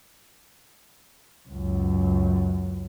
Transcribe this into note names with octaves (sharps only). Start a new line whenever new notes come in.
C#2 F#2